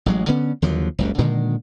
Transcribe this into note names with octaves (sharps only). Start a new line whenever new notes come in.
A1 F#3 G#3
D3 B3 C#4
D#2 D3 F3 F#3
F#1 C#2 G2
A#2 D3 D#3 G#3